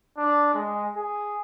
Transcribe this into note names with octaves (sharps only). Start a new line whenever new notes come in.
D4
G#3
G#4